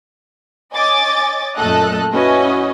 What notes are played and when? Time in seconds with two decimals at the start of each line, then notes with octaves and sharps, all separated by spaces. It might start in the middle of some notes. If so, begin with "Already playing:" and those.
0.74 C#5 D#5 G#5 D6 A6
1.56 F#2 A#2 A3 A4 D#5 F#6
2.13 C#4 E4 F#4 B4 D#5 G#5